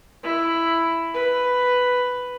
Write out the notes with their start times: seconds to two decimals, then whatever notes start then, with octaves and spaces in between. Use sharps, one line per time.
0.23 E4
1.14 B4